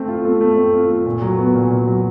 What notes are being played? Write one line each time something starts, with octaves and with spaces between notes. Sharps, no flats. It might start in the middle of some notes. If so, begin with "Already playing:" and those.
Already playing: A3 C4
F4
A3
A3
C4
F4
A3
A#2
F#3
B3
A#2
A#2
F#3